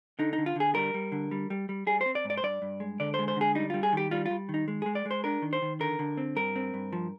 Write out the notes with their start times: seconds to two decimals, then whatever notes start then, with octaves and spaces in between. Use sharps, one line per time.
0.19 D3 D#4
0.33 D#4
0.38 D3
0.46 F4
0.56 D3 G#4
0.75 G3 A#4
0.94 G3
1.12 D3
1.31 G3
1.50 G3
1.69 G3
1.87 G3 G#4
2.01 C5
2.06 C4
2.15 D5
2.25 G#2
2.30 D5
2.37 C5
2.43 G2 D5
2.62 G2
2.80 G#3
3.00 D3 D5
3.14 C5
3.19 G#3
3.28 C5
3.36 D3 G#4
3.55 G3 D#4
3.70 G3 F4
3.83 G#4
3.93 D#3 G4
4.11 G3 F4
4.26 F4
4.31 G3
4.49 D#3
4.54 D#4
4.68 G#3
4.82 G#3 G#4
4.95 D5
5.05 G#3
5.11 C5
5.24 D4 A#4
5.42 D#3
5.53 C5
5.62 D#3
5.80 D3 A#4
5.99 D3
6.17 C4
6.36 G2 A#4
6.56 C4
6.74 G2
6.93 F3